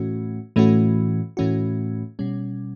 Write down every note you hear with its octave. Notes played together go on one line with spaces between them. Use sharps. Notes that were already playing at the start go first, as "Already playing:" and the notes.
Already playing: A2 E3 A3 C#4 F#4
A2 E3 A3 C#4 F#4
A2 E3 A3 C#4 F#4
B2 G3 C#4